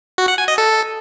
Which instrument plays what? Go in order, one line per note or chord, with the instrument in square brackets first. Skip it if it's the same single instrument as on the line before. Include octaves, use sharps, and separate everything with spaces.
[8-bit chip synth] F#4
F#5
G#5
D#5
A4